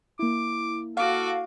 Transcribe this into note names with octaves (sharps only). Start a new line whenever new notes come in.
A#3 E4 D6
F#4 A4 F5 D6